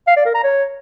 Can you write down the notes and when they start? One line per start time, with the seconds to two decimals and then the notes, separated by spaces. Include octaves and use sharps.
0.08 F5
0.17 D5
0.26 A#4
0.35 A#5
0.44 C#5